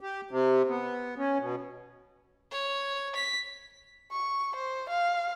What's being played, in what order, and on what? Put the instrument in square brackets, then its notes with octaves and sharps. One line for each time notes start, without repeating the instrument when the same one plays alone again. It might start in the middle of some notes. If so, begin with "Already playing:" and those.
[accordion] G4
C3
B3
C#4
B2
[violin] C#5
B6
[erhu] C#6
C5
F5